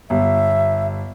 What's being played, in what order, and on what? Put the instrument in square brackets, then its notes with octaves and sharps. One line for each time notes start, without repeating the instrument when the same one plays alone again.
[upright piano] G1 [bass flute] E5